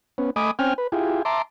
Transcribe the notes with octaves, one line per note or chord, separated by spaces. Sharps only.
B3 C#4
A3 D#5 G#5 B5 D6 D#6
C4 C#4 G5 G#5 F6
B4
E4 F4 G4 G#4
E5 A5 A#5 C6 D6